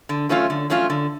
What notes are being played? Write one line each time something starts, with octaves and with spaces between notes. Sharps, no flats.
D3
F#3 A3 C#4 F4
D3
F#3 A3 C#4 F4
D3